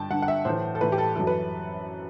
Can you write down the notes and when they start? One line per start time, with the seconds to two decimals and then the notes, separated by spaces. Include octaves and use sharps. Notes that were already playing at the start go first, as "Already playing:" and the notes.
Already playing: G2 D3 G5 A5
0.10 G2 D3 F#5
0.22 F#5
0.28 E5
0.45 A2 E3 C5
0.75 A4
0.81 A2 E3 B4
0.92 G4
0.98 A4
1.16 F#2 E3 A4
1.27 B4